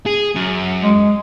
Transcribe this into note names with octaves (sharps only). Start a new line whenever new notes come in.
G#4
F#2
G#3